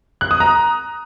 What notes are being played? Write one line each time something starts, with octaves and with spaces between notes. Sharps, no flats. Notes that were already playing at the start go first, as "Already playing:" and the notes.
F#6
D#6
A#5